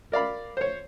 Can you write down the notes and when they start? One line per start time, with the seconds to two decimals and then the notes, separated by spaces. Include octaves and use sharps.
0.12 A#4 D5 F5 B5
0.57 C5 C#5